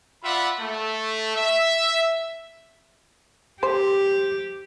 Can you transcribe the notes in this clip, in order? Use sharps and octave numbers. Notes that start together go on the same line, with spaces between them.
F4 D5 E5 F#5 B5
A3
E5
G4 C5